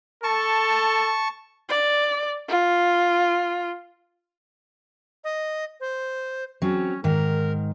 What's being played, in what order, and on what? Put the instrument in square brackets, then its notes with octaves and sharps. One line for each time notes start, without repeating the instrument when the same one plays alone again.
[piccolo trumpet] A4 [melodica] A5 C#6
[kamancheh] D5
F4
[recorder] D#5
C5
[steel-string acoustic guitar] F#3 C4 [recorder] C#4
[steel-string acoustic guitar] G#2 D#3 [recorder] A#4